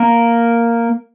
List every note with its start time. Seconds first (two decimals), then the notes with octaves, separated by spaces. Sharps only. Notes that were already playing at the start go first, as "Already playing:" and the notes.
Already playing: A#3 A#4